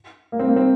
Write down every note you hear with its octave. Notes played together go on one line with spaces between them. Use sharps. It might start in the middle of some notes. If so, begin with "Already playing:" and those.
A#3
C4
A#3
C4